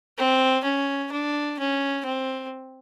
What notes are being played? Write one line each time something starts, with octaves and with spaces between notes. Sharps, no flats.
C4
C#4
D4
C#4
C4